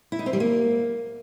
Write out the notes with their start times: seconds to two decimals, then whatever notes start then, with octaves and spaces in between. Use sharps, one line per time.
0.12 E4
0.19 D#4
0.26 C4
0.33 G3
0.40 A#3